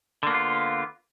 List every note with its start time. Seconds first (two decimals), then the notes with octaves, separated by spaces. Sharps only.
0.23 D3
0.27 A#3
0.30 B3
0.34 F4